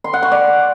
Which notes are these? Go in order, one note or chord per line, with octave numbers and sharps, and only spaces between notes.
C6
F#5
C#6
D5